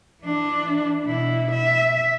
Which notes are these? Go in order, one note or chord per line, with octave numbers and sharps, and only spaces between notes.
E3 D4
B2 E4
E5